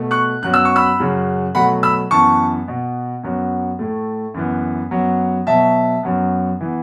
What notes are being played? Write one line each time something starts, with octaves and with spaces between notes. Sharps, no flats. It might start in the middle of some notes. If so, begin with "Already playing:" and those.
Already playing: B2 A3
C#6 F#6
F#2 F#3 B3 F#6
E6
C#6
B5 E6
F#2 C#3 F#3
B2 F#3 A3 F#5 B5
B5 E6
F#2 E3 B3 A5 C#6
B2 B3
F#2 F#3 B3
A2 A3
F#2 E3 B3
F#2 F#3 B3
B2 F#3 B3 E5 A5
F#2 F#3 B3
E3 B3